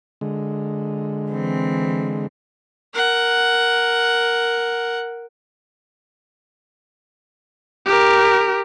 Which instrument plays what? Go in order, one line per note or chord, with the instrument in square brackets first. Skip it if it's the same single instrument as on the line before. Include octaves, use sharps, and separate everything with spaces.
[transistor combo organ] D3 G#3
[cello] E3 C4
[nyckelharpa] A#4 F#5
[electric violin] G4 A#4